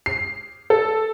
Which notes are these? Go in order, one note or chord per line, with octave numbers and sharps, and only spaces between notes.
C7
A4